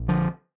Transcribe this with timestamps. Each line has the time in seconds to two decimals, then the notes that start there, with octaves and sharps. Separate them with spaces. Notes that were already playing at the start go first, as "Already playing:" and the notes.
Already playing: A#1
0.08 D3 F3